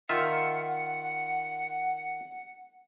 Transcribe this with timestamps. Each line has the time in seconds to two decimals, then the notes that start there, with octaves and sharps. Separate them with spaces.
0.09 D#3 F4 E5 F#5